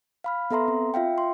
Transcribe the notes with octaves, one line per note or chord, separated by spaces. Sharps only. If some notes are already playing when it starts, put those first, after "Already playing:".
F5 B5 F6
B3 A4 E5 A#5 C6
C4
F4 E5 F5 G5
C6